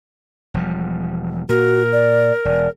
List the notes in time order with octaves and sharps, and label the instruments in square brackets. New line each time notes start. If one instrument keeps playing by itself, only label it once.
[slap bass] E1 F3 G3
[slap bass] A#2 [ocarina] F#4 [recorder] A#4
[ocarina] D5
[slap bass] E1 [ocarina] D5